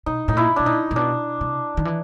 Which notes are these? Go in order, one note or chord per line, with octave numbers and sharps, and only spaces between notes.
B2 D#4
A2 D#4
A#2 E4
B2 D4
A#2 D#4
A#2
B2 D4
C3
D#3
E3